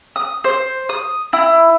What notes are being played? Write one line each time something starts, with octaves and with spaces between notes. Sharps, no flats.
D#6
C5
D#6
E4